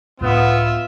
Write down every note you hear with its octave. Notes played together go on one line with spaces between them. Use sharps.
C#2 A2 B3 D4 F4 E5